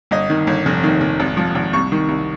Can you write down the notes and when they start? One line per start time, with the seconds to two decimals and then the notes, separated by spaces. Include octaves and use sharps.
0.11 G1 D#5
0.30 D#3
0.47 G1
0.66 F1
0.84 D#3
1.01 F1
1.20 G#1
1.37 F3
1.55 G#1
1.73 C2 C#6
1.92 D#3
2.09 C2